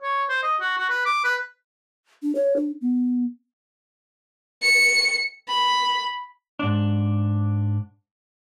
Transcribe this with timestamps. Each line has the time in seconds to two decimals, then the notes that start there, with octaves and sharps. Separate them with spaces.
0.02 C#5
0.29 C5
0.43 D#5
0.61 F#4
0.78 F#4
0.90 B4
1.06 D6
1.24 B4
2.23 D4
2.35 C#5
2.56 D4
2.81 B3
4.62 C#7
5.48 B5
6.59 G#2 D4